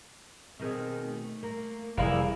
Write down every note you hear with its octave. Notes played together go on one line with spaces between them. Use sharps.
B2 D#3 C4 G#4
A3
A#3
F1 E3 G3 A#3 E4 G#4